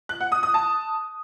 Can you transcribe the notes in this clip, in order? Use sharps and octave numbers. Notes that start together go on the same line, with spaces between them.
F#6
F#5
D#6
D#6
A5